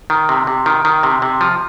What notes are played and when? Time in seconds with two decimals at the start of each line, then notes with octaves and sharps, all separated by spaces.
0.10 D#3
0.29 C3
0.47 C3
0.66 D#3
0.85 D#3
1.03 C3
1.22 C3
1.41 F3